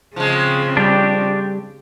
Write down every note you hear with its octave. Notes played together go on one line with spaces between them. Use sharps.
C#3 F3 G#3 C4
G3 D4 G4